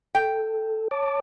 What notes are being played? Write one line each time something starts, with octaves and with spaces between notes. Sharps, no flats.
A4 G5
C#5 A5 D6